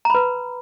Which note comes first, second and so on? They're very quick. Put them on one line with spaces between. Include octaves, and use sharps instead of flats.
A#5 B5 B4